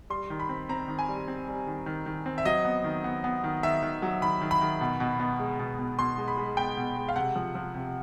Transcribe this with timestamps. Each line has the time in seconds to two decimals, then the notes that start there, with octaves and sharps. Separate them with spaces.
0.10 G3 C6
0.30 D#3
0.40 B5
0.49 C4
0.69 C4 A#5
0.88 D#3
0.99 G#5
1.08 G3
1.28 C4
1.48 G3
1.67 D#3
1.86 D#3
2.06 D#3
2.26 C4
2.38 E5
2.45 F#3 D#5
2.65 B3
2.84 D#3
3.04 B3
3.24 B3
3.44 D#3
3.63 D#3 E5
3.83 D#3
4.02 F#3
4.21 D#3 B5
4.41 D#3
4.51 B5
4.61 D#3
4.81 B2
5.00 B2
5.20 B3
5.39 G#3
5.59 B2
5.79 B2
5.99 B2 C6
6.18 G#3
6.28 B5
6.37 G#3
6.57 B3 G5
6.77 B2
6.96 G#3
7.09 F5
7.16 C3 F#5
7.36 F3
7.55 F3
7.75 C3